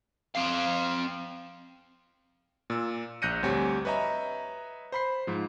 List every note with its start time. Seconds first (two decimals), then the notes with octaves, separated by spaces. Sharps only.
0.35 C4 F5
2.70 A#2 E6
3.22 A#1 F#6 G6 A#6 C#7 D#7
3.43 D2 G3 C4 G4 C#5 G#5
3.85 B4 C#5 D#5 E5 A#5
4.92 C5 B5 C7
5.27 G#2 F3